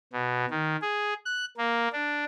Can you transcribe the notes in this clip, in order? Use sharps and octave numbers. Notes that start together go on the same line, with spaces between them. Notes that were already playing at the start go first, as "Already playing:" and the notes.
B2
D#3
G#4
F#6
A#3
D4